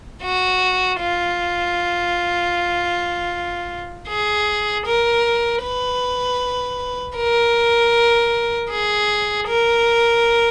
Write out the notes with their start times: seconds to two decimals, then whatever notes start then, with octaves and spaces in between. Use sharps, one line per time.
0.23 F#4
1.00 F4
4.08 G#4
4.86 A#4
5.63 B4
7.17 A#4
8.71 G#4
9.48 A#4